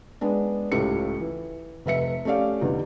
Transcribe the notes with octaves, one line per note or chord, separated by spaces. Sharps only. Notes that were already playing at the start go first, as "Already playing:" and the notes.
G#3 B3 D4
C#2 A2 C#3 G4 A4 C#7
E3
F1 B4 E5 C#7
A3 C#4 G4 D5 F5
E2 D3 G3 D#4